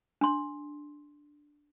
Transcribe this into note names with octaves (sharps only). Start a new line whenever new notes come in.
D4 C6